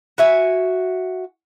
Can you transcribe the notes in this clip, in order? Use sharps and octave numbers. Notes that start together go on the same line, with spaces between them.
F#4 E5 G#5